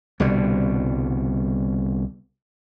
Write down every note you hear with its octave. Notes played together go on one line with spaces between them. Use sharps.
C2 B2 D3 G3